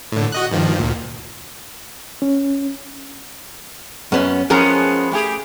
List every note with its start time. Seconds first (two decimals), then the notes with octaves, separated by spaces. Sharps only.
0.12 A2 D3
0.32 F#4 D#5 F#6
0.51 G2 D#3 F3
0.79 D2 A#2
2.22 C#4
4.12 F#2 B3 C#4
4.50 F3 G#3 B3 C#4 G#4 A#4
5.12 A3 G4 G#4